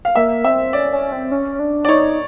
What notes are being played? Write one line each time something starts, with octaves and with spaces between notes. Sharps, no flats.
F5
A#3 E5
C4 E5
C#4 D5
C#4
C4
C#4
D4
D5
D#4 C#5